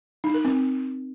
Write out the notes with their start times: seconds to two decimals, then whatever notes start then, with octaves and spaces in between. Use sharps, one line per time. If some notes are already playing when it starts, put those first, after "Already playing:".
0.24 D#4
0.34 A#4
0.45 C4